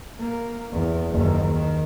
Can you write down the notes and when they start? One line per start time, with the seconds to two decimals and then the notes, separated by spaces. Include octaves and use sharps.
0.19 A#3
0.72 E2
1.10 F#1 D#2
1.53 D#3